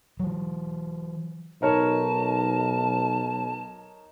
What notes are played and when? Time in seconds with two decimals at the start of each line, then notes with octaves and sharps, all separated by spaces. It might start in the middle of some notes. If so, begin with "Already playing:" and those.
0.20 E3 F#3
1.62 B1 D#4 A#4 C#5 A5